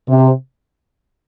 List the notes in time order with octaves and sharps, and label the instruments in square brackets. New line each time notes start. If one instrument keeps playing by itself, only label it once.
[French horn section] C3